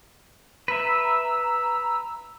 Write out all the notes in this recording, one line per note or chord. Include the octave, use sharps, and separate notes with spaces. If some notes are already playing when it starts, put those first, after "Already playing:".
B4 E5 A#5 E6